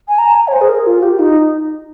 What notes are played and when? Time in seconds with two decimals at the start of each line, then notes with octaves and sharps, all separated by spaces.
0.08 G#5
0.18 A#5
0.35 G#5
0.48 C#5
0.52 C5
0.61 G#4
0.69 A#4
0.86 F4
1.03 G4
1.12 F4
1.19 D#4